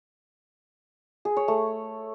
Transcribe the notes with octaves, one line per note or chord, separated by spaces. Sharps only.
G#4
C#5
A3